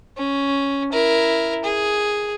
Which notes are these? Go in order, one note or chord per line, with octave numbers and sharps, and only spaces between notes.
C#4
E4 A#4
G#4